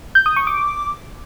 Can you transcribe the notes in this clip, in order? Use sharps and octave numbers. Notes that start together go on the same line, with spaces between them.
G6
D#6
C#6
D6